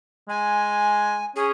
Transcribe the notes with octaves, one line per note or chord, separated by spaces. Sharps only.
G#3 G#5
C#4 G#4